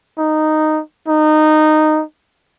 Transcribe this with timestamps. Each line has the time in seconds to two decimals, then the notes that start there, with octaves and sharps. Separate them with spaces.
0.18 D#4
1.08 D#4